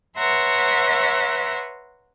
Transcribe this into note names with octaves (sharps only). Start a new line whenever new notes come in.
B4 C#5 E5 F#5 A#5 C6